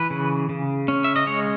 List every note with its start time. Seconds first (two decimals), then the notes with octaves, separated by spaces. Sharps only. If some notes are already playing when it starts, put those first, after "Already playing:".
Already playing: E3 B4
0.10 C#3
0.49 C#3
0.88 C#4
1.04 E5
1.16 D#5
1.27 G#3 C#5